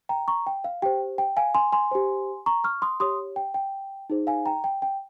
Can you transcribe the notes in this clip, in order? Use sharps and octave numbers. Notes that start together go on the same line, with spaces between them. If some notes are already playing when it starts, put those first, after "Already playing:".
G5 A#5
A#5 C#6
G5
F5
G4 C5 G5
G5
F5 G#5
G#5 C6
G#5 C6
G4 C5
A#5 C#6
C#6 F6
C6 D#6
G4 C#5 C6 D#6
G5
G5
D#4 G#4 C5
F5 G#5
G5 A#5
G5
G5